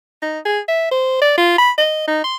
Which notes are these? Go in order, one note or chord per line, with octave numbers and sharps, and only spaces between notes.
D#4
G#4
E5
C5
D5
F4
B5
D#5
D#4
C6